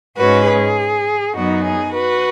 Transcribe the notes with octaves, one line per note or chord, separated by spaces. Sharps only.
G#2 G#3 C#4 F#4 B4
G#4
F#2 F#3 B3 D#4 F#4
G#4
F#4 B4